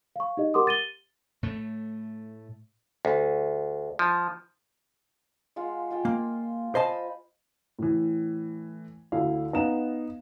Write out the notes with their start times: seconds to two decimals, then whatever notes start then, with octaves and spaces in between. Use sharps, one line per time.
0.16 F5 C#6
0.37 D#4 G4 D#5
0.54 G4 A#4 F#5 C6 D6 D#6
0.67 A6 D#7 G7
1.43 A2 A3
3.05 D2
3.99 F3
5.56 G#3 F4 F#5
5.90 G#3 F4 G5
6.05 A#3
6.75 C5 D#5 A5 B5
7.79 A2 E3
9.12 D2 D3 E4 F5
9.53 B3 D#4 F5 A#5 E7